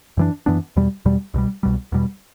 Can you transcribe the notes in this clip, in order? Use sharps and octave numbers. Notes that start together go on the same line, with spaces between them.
F#2 E3 B3 D4
F#2 E3 B3 D4
E2 B2 G3
E2 B2 G3
C2 B2 G3
C2 B2 G3
E2 B2 G3